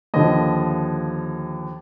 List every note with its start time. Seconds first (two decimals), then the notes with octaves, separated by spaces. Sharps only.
0.14 D#2 D3 F3 D#5